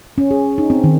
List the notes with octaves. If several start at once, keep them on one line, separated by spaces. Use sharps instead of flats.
C#4
G#4
D#4
C4
D#3